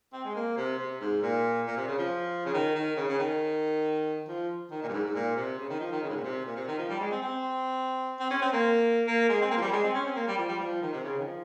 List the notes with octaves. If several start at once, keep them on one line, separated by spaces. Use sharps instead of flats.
C4
G#3
A#3
C3
C3
G#2
A#2
A#2
C3
C#3
F3
C#3
D#3
D#3
C#3
C#3
D#3
F3
D#3
A#2
G2
G#2
G#2
A#2
C3
C#3
D#3
F3
D#3
C#3
G#2
A#2
C3
A#2
C3
D#3
F3
G3
G#3
C4
C4
C4
C#4
C4
A#3
A#3
G#3
C4
A#3
F3
G3
G#3
C4
C#4
C4
A#3
G3
F3
G3
F3
D#3
C3
C#3
D#3
F3